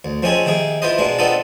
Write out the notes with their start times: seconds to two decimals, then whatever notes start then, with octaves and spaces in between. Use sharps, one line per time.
0.05 D2
0.23 F3 C4 C#4 D#4 G#4
0.45 C3 D#3 A#3 G#4
0.82 E4 F4 B4 C5 D#5
0.98 B2 G#3 A#3 D4
1.18 B3 C4 D4 D#4 F4 A4